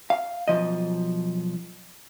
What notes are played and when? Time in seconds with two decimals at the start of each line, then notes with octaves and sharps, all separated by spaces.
0.10 F5
0.48 B1 B2 F3 D#5